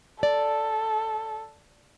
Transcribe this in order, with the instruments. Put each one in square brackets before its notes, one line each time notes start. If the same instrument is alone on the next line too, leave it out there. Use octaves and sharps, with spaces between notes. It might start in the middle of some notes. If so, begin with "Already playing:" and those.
[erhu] A4 [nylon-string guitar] D5